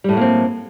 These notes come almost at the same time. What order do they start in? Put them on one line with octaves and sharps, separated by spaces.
G3 A2 F#3 A#3 C4